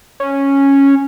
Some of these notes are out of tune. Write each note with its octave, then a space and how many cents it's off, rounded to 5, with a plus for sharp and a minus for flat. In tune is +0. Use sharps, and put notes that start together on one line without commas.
C#4 -5